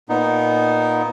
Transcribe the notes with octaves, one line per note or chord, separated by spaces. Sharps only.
A#2 B3 D#4